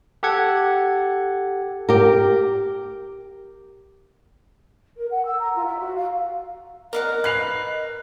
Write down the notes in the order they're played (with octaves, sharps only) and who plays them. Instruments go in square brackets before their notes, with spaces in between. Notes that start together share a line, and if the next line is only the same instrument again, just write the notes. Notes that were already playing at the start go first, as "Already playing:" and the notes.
[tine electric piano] G4 A4 F#5 G#6
[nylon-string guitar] G4 A#4
[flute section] A#4
F#5
E6
A#5
F4
E5
F#4
F5
[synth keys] A#4 [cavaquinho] D5 F5 F#5 [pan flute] D#5
[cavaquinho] B4 [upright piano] F#6 C7 F7